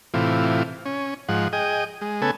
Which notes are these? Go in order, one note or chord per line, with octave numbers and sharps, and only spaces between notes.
A2 C3 E3 F4
C#4
G#2 F3 F#5
G#4 D#5 G5
G#3
C#3 A3 B3 A4 G#5